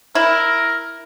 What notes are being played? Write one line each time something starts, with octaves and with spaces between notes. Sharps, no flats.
E4 A#4